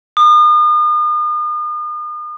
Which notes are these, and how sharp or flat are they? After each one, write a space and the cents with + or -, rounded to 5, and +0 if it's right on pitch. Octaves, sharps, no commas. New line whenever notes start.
D#6 -40